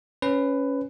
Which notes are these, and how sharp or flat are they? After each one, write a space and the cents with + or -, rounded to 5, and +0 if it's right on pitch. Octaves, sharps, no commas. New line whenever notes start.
C#4 +0 B4 +15